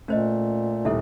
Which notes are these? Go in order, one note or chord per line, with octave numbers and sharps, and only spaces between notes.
A#2 A3 C#4 C5 D#5
D#1 E4 A4 E5